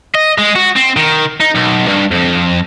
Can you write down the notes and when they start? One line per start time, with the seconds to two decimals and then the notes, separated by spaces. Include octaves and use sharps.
0.15 D#5
0.38 G#3
0.55 F#4
0.76 C4
0.97 D#3
1.40 D#4
1.55 B1
1.87 G2
2.11 F2